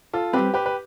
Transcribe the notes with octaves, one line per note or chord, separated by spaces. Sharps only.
F4 A4
G3 C4 G4 B4
G4 B4
B4